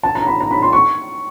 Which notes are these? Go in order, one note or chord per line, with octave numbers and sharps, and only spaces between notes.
A5
A#5
B5
A#5
B5
C6
C#6